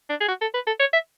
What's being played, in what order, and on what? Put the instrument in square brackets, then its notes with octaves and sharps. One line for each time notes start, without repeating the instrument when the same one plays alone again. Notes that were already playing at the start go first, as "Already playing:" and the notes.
[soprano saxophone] D4
G#4
F#4
A4
B4
A4
C#5
E5